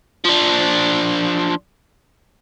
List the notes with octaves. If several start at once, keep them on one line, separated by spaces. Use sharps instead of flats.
F3 D4